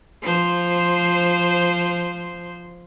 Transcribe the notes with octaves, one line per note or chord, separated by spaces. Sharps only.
F3 C5